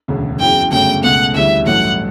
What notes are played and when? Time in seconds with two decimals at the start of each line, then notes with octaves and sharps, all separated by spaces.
0.08 E1 D2 C#3
0.40 F#1 E2 C#3 F#3 G5
0.71 G1 F#2 C#3 F#3 A3 G5
1.03 C#2 B2 A3 F#5
1.34 D2 C#3 E3 G3 E5
1.66 A1 G2 F#3 A3 F#5